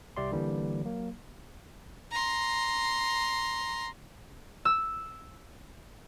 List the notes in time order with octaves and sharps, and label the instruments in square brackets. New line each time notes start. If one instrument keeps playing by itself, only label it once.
[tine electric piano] C2 G4 D5 E5 C6
D3 E3 G3 A#3
F#3 A#3
[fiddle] A#5 C6
[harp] E6